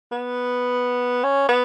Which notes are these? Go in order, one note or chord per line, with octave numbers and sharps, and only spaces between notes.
B3
C#4
B3